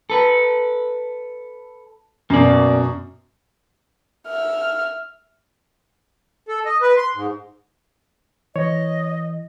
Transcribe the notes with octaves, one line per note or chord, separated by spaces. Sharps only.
A4 B4
F#2 B2 A#3 D5
E5 F6
A4
D#5
B4
C6
G#2
E3 C#5 D#5